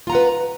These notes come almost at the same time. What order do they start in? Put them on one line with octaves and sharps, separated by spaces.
F4 A#5 F#5 B4